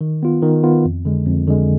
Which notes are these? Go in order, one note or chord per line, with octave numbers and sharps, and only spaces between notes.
D#3
B3 F4
D#3
B3 F4
F2
D3 G#3
F2
D3 G#3